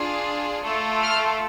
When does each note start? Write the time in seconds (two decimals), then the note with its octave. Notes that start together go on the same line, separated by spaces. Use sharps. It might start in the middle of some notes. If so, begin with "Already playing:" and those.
Already playing: D4 F4 G#4
0.63 A3 F4 A4
1.02 F6